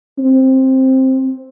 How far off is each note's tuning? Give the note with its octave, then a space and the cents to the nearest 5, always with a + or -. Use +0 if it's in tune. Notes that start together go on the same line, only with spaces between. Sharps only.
C4 +10